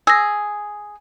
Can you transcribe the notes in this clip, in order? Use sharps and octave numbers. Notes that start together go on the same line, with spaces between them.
G#4 E6 A#6